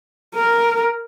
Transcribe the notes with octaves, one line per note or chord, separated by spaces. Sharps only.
A#4